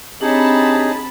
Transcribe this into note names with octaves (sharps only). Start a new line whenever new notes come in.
C3 C4 D4 D#4 G#4 C#5 A5 B5